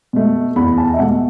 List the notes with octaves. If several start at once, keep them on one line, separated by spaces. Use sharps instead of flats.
B2 A3
E2 B5
A5
E5
B2 A3 F#5